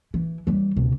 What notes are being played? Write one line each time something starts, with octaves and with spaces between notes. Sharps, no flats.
E3
E3 G3
C#2 B2